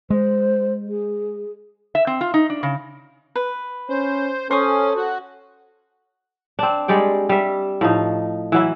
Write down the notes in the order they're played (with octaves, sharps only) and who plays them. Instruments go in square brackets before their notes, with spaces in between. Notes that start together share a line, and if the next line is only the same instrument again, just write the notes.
[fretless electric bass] G#3 [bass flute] C5
[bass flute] G#4
[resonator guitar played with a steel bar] E5
C4
F4
D#4
D4
C#3
[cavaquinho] B4
[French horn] C#4 [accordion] C5
[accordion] C#4 [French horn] A4 [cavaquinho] C5 C#6 D#6
[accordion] F#4
[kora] C4 D4
G3 G#3 D5 G5
G3 E5
A2 F3 D#4
E3 F#3 E4